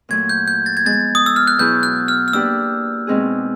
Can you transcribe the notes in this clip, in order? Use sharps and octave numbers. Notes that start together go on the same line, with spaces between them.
A#2 F#3 A3 G#6
G6
G6
A6
G#6
F3 G#3 B3 A6
D#6
E6
F6
F#6
B2 F#3 B3 E4 G#4 G6
F#6
F6
F6
A#3 D4 G4 B4 D5 E6
B2 G#3 C4 D#4 G#4